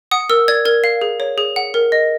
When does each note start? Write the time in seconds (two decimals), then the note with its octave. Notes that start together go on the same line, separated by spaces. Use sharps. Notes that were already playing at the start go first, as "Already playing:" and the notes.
0.11 F#5 D#6
0.30 A#4 E6
0.48 D5 G#6
0.65 A#4 G#6
0.84 F5
1.01 G#4
1.20 C#5
1.38 G#4
1.56 F#5
1.74 A#4
1.92 D#5